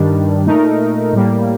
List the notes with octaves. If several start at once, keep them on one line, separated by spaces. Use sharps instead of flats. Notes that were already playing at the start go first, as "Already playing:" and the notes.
Already playing: G2 D#3 G3 D4
A#2 A3 D#4 A#4
A2 G3 A#3